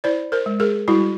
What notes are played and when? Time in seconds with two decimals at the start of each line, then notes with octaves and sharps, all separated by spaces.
0.04 E4 C5 D5
0.32 A#4 C5
0.46 G#3
0.60 G#4 A#4
0.88 G3 E4 F#4